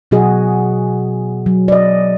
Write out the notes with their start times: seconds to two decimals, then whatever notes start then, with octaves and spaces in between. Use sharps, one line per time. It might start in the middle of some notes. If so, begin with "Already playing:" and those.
0.11 B2 F#3 F#4 G#4 D#5
1.46 F#3
1.68 D5 D#5